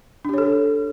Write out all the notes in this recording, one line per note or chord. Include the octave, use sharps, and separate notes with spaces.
D4 G4 A4 C#5